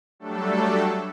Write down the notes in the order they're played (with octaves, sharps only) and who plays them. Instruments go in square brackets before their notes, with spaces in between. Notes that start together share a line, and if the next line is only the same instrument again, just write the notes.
[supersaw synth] F#3 G3 A3 D4 A4